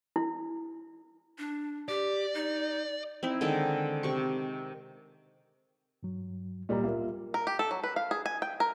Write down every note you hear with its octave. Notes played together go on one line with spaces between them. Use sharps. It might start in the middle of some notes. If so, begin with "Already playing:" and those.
E4
D4
G4 D5
D#4
C4 D#4 E4
D3 D#3 G#3 D#4
C3 C#6
G2 F#3
A#2 G3 D#5 A#5
A#3 F4 A#4 E5
A#4
G4
A4
F#3
B4
F5
G#4
G#5
G5
A#4